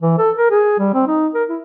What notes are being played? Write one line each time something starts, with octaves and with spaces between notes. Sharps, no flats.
E3
A4
A#4
G#4
G3
C4
D#4
A#4
E4